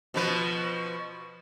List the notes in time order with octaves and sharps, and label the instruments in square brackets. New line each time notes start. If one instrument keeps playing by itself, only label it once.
[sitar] B2 F3 B4